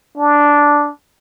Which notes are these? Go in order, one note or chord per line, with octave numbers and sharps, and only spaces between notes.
D4